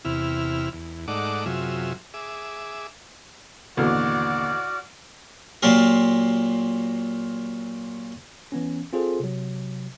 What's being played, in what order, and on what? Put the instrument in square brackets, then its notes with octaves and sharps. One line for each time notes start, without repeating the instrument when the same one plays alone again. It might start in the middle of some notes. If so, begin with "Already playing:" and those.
[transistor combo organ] E2 C3 E4 F6
E2
G#2 A3 D#4 D5 F#5 D6
F#2 C3 F#3 F4 G#4 E5
G#4 E5 D6
[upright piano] A1 [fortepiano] D#2 B2 D3 [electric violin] F#4 D5 [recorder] F6
[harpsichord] A#2 F#3 A#3 F4 G4 A#4
[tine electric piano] E3 B3 C#4
C4 F4 G#4 A4 C5
C3 F#3